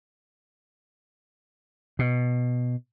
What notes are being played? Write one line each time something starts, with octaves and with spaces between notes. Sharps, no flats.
B2